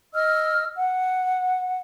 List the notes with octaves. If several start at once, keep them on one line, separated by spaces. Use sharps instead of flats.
D#5 E6 F6
F#5